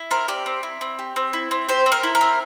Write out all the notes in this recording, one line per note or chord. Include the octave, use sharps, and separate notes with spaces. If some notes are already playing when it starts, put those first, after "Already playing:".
Already playing: E4
C4 A#4
G4 D5
C4
E4
C4
G4
C4
E4
C4
G4 C5
C4
A#4
E4
A#4
C4